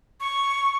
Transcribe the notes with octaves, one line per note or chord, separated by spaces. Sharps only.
C#6